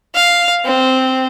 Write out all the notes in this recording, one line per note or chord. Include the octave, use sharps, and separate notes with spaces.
F5
C4